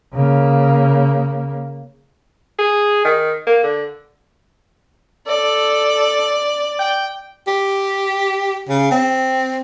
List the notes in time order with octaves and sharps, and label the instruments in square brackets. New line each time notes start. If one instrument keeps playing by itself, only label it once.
[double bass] C#3 A#3
[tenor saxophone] G#4
D#3
A#3
D3
[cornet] A4 [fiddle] D5
[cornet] G5
[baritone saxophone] G4
C#3
C4